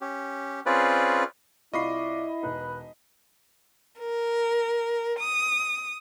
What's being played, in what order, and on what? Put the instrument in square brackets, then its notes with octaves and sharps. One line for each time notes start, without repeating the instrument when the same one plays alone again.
[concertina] C#4 G4
C4 C#4 F4 G#4 B4 D5
[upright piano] C2 F4 C#6 [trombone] E4 [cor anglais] D5 [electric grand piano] D#5 B5 C7
[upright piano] E1 D#4 [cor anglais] B4
[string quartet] A#4
D#6